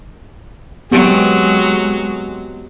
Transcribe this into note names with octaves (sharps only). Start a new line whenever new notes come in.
F#3 G#3 B3 C4 G4